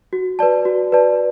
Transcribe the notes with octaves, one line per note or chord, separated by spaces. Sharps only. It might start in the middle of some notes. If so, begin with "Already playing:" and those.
F#4
B4 D5 A5
F#4
B4 D5 A5